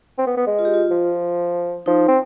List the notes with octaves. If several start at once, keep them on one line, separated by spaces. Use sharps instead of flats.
C4
B3
B3
G#3
F4
G4
F4
F3
F3 D#4
C4